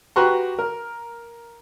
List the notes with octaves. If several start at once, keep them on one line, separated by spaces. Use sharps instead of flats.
F#4 G4 B4 A#5 C6 C#6
A#4